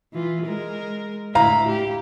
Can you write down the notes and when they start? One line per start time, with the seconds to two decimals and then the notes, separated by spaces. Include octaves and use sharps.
0.13 E3 F4
0.45 G#3 A#4
1.35 A2 D3 E4 F5 A#5
1.68 G4